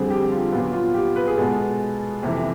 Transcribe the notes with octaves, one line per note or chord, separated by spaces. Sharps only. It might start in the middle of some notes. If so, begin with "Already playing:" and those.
Already playing: F2 D3 G3 C4 G#4
G4
F4
A#2 F#3 B3 F4
F4
G4
B4
G#4
B2 G#3 B3 A4
F2 C3 E3